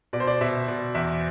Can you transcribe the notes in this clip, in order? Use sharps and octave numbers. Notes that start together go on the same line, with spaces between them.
B2 D5
C5
D5
B2 E5
B2
E2 E5